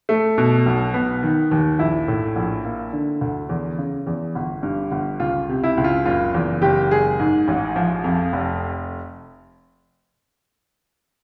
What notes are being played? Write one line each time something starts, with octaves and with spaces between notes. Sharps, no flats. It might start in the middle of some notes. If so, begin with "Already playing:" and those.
A3
B2
B1
B3
D#3
D#2
A#1 E4
A2
A#1
A#3
D3
D2
E2
C#3
E2
G1
G2
G1
C#2 F4
C3
E4
C#2
F4
F#1 F4
E2
F#1 G4
G#3 G#4
G#2
A1
F3
F2
F1